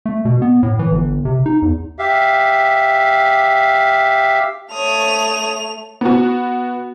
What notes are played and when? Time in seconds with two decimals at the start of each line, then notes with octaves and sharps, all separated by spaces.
0.06 A3
0.25 B2
0.42 B3
0.63 A2
0.79 E3
0.91 G1
1.25 C3
1.46 D#4
1.62 E2
1.99 G4 E5 F5
4.73 A3 C#5 D#6 F7
6.01 B3 F#4